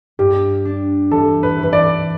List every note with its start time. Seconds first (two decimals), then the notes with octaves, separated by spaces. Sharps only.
0.19 G2 G4
0.65 D4
1.11 E3 A4
1.43 B4
1.58 E3 B4
1.73 D5